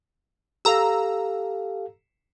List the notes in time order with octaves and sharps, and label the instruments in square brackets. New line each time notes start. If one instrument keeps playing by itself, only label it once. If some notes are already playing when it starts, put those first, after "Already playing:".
[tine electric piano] G4 A4 F5 [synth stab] A#5 E6